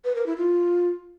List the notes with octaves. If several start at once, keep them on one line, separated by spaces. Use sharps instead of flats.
B4
A#4
E4
F4